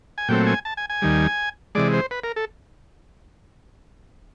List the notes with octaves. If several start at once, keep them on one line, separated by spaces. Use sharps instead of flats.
G#5
A#2 F#3 A3 C4 G5
G#5
A5
G#5
G#5
D#2 D#3 G3
C3 E3 G#3 D5
C5
B4
A#4
A4